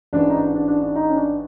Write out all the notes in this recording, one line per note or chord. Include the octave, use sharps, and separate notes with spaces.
A1 G#2 E3 D4
D#4
D4
D4
D4
D4
D#4
C#4
D4